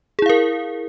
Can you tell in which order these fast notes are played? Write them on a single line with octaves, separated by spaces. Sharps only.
G#4 E4 F5 A#4